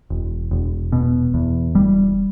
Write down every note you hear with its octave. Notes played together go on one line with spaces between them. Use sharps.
E1
E1
B2
E2
E1 G3